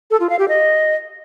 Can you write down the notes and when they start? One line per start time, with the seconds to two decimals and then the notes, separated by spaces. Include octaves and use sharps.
0.11 A4
0.20 F4
0.30 F5
0.39 G4
0.48 D#5